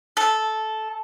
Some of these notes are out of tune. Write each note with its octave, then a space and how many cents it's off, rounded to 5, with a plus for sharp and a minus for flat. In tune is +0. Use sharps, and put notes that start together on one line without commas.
A4 -10